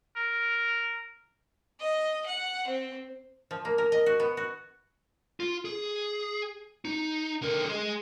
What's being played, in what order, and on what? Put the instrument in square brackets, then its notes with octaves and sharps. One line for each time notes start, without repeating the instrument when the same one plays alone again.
[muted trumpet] A#4
[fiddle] D#5
F#5
C4
[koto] F3
A#3
A#4
D#5
F#4
B3
F#4
[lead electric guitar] F4
G#4
D#4
D3 A#4
G#4 C6